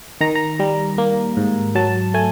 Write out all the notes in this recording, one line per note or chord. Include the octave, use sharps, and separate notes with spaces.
D#3 A#5
A#5
G3
A#3
G#2
F#3 A5
A3 G#5